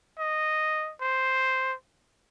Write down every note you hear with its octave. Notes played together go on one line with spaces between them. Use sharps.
D#5
C5